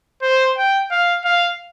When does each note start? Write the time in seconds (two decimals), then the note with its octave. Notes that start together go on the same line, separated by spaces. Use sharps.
0.22 C5
0.57 G5
0.91 F5
1.24 F5